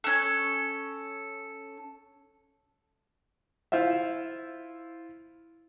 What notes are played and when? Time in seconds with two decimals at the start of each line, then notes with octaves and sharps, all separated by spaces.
0.04 C#4 A4
3.72 E4 F4 C5 E5